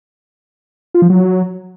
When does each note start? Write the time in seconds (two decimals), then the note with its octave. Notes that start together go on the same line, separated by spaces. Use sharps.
0.94 F4
1.02 F3
1.10 F#3